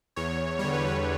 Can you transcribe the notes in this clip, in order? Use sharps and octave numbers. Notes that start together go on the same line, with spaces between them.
E2 C#5
D3 G3 C#5
B4
C#5